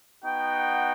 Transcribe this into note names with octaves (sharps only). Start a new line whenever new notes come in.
B3 D#4 F#4 G5